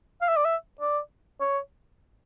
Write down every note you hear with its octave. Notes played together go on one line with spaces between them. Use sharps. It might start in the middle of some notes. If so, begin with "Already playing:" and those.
F5
E5
D5
E5
D5
C#5